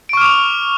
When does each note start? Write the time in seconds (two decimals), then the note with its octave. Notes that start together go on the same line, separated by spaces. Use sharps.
0.09 D7
0.13 C#6
0.17 F6
0.21 D6
0.25 F7